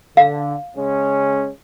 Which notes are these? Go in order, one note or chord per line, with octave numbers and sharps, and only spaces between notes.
D3 F5
C#3 G#3 C#4